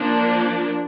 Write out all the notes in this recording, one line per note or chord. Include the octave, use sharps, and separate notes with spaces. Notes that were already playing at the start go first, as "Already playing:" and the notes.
Already playing: F3 A#3 D4